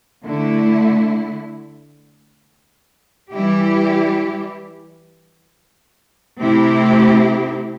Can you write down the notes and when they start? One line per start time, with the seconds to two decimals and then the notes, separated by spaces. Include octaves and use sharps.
0.23 D3 A3 E4
3.32 E3 G3 E4 G4
6.40 C3 A3 C4 E4 G4